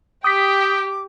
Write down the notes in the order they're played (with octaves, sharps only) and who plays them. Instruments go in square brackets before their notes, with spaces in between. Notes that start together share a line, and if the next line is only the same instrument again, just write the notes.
[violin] G4 [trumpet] G5 [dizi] D6 [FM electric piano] D#6 B6